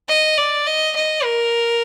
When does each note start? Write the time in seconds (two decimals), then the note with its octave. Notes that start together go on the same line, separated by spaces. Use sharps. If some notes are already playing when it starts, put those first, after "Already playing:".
0.08 D#5
0.37 D5
0.66 D#5
0.95 D#5
1.24 A#4